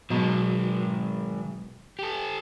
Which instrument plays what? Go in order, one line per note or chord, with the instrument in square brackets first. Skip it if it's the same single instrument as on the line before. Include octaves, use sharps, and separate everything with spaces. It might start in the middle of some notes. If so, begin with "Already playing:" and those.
[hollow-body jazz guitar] B2 F#3 [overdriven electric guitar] D#3 G#3
[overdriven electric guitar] G4 A4